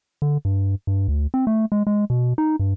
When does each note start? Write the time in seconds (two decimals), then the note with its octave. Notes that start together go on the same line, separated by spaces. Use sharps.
0.22 D3
0.45 G2
0.87 G2
1.08 D2
1.34 C4
1.47 A3
1.72 G#3
1.87 G#3
2.10 B2
2.38 D#4
2.59 G2